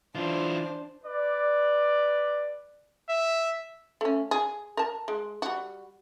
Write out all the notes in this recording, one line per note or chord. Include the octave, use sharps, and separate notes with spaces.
E3 D4 F4 C5
B4 D5
E5
A3 C#4
G#4
A#4 A5
G#3
G3 F#4